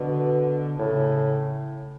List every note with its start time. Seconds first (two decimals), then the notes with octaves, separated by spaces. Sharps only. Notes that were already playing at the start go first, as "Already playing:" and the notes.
Already playing: B2 D3
0.79 A2 C#3